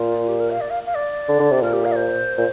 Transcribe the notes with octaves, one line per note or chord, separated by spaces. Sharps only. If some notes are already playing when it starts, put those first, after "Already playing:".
Already playing: A#2 F4
G4
A#4
F5
D5
F5
F5
D5
D3
D3
C3
A#2 A#4
G4
F5
D5
C5
A#2